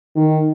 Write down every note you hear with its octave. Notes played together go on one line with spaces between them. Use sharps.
D#3